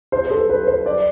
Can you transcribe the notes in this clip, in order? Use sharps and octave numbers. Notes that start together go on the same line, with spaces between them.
C5
B4
A4
B4
C5
D5